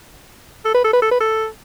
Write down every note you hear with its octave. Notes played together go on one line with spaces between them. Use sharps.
A4
B4
A4
B4
A4
B4
A4